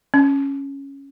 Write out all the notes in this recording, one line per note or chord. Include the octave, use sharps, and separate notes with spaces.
C#4